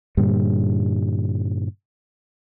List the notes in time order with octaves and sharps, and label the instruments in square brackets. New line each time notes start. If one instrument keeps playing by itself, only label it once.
[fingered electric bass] G2 A#2 D3 G3